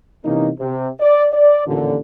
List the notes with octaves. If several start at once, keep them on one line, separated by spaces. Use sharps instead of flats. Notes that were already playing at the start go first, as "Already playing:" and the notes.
C3 E3 A#3 C#4 D#4
C3
D5
D5
A1 D#2 A#2 D3